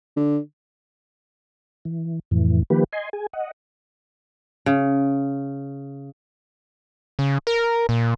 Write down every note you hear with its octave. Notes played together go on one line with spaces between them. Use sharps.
D3
E3
F2 A2 E3
D#3 F3 A#3 G4 B4
D#5 G#5 C6
G#4 G#5
D#5 F#5
C#3
C#3
A#4
A#2